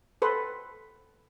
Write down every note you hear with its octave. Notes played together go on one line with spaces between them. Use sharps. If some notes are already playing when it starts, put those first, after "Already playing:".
A4 B4 C5